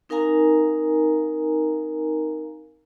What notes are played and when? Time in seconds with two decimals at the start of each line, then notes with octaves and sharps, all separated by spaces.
0.09 C4 D#4 A#4 F5 G#5 A#5